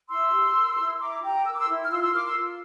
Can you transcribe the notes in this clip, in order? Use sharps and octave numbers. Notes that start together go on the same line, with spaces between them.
E4 C6 E6
G4
A#4
E4
E4 A#5 D6
G4 G5 A#5
A#4 E6
D6
C6 E6
E4
F6
F4 C6 E6
F6
C6 E6
A#4 D6 F6
C6 E6
F4